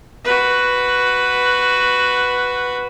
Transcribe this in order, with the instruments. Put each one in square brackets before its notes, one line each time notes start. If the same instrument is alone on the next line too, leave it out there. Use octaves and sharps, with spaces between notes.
[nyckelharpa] F#4 B4